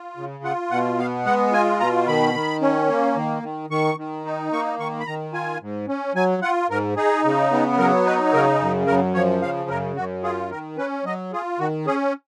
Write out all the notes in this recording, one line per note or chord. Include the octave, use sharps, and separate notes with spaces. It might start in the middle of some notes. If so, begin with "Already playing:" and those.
Already playing: F4
C#3
F4 F#5
B2 F#5
B3 F5
G#3 F#5
F4 G#5
B2 A#5
D#3 B5
D#3
C#4
A#3
D#3
D#3
D#3 C#6
D#3
D#4
A#3 C#6
D#3 C#6
B5
D#3 A#5
F4 G#5
G#2
C#4
F#3 G#5
F4 F#5
G#2 A#4
D#4 G#4
C#3
B3
F#3 A#4
D#4 B4
C#3 A#4
F#2
F#2 A#4
F3 C#5
C#3 F5
F#2 A#4
F#2 F#4
F4 G#4
D#3 A#4
C#4 B4
F#3 D#5
F4 G#4
D#3 F#4
C#4 G#4